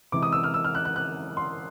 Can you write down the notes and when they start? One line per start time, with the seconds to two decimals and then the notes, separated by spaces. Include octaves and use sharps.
0.12 C3 E3 G#3 D6
0.23 D#6
0.32 E6
0.44 F6
0.54 E6
0.64 F6
0.75 F#6
0.85 F#6
0.96 F#6
1.37 C6